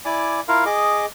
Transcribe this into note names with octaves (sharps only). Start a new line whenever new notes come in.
E4 D5 G#5 D6
E4 F4 A#4 F5
G#4 D#5 D6